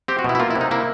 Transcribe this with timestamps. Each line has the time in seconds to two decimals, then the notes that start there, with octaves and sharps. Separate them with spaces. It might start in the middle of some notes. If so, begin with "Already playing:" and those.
0.08 C4 G4
0.19 F#4
0.24 B2 E4
0.35 E4
0.40 A#3 F4
0.51 E4
0.55 C3
0.61 D#4
0.71 A#3 E4